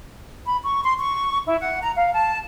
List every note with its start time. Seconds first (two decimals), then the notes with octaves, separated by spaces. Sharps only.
0.46 B5
0.63 C#6
0.84 C6
0.98 C#6
1.46 E4
1.61 F#5
1.82 A#5
1.96 F5
2.13 A5